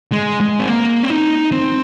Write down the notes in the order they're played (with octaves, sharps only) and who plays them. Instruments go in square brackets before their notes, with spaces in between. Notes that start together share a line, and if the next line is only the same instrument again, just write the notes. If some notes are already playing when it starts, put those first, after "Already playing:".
[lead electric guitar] G#3
G#3
C4
A#3
C4
D#4
C4